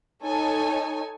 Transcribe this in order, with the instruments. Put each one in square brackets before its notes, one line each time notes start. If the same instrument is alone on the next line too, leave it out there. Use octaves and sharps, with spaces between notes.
[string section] D#4 A4 C#5 G#5